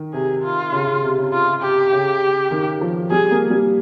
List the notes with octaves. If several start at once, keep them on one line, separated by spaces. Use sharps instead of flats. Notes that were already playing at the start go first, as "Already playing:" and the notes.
Already playing: D#3
C3 G#4
F4
C#3
C#3
C3
C#3
F4
G4
C#3
D#3
F3
G3 G#4
A#3
G3